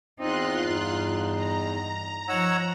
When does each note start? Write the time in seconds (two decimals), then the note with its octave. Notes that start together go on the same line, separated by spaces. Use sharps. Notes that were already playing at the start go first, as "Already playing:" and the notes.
0.19 E2 C4 D#4 F4 C6 F#6
0.67 G2 D#4
1.35 A#5
2.29 F3 D#4 C#5 F#5 E6